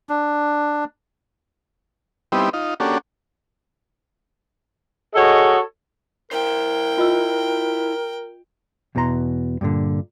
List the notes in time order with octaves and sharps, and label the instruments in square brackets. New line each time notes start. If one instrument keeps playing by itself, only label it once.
[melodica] D4
[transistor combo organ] G3 B3 C4 D#4 E4 G4
D#4 F4
A#3 C#4 D4 F#4 G4 A4
[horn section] F#4 G#4 A4 C#5 D#5
[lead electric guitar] E4 C5 [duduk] A#4 [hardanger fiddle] G5
[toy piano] F4 D#5 E6
[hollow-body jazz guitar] E2 B2 E3 A4 A#5 C6
G2 A#2 D3